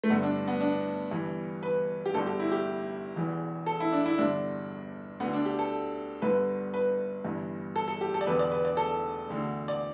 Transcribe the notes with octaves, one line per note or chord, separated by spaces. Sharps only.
A3
G1 G2 D3 B3
D4
B3
D4
G1 G2 E3
B4
G4
G1 G2 D3 A4
G4
E4
G4
E1 E2 E3
A4
E4
D4
E4
G1 G2 D3 D4
D2 D3 B3
D4
G4
A4
G1 G2 D3 B4
B4
G1 G2 E3
A4
A4
G4
A4
D5
E1 E2 D3 B4
D5
B4
D5
A4
E1 D2 D3
D5